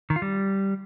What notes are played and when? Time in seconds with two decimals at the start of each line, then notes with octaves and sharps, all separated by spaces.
0.10 D#3
0.16 F4
0.22 G3